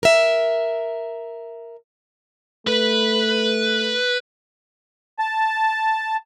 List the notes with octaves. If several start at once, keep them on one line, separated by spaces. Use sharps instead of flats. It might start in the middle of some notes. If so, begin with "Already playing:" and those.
A#4 E5
A3 B4
A5